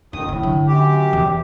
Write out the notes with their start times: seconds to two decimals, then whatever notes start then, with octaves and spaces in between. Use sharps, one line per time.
0.13 F2 D#3 C#4 D#6
0.29 D2 A2 F#3
0.43 D3
0.67 F#2 G4
1.13 E2